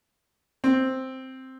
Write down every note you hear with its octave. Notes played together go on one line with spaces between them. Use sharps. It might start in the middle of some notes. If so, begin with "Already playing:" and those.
C4